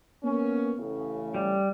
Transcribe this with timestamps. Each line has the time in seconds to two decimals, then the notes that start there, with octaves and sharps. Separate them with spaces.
0.23 A#3 B3 C#4
0.78 A1 C#3
1.34 G3